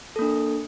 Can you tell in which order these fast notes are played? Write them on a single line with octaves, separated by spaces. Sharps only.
A4 A#3 D4